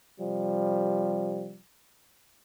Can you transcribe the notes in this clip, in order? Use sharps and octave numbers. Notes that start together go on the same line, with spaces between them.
C3 F3 G3